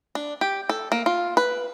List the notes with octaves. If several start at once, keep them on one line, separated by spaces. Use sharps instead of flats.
D4
G4
A4
A#3
F4
B4